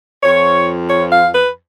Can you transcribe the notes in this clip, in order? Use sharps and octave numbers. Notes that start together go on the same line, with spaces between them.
F2 F3 C#5
C#5
F5
B4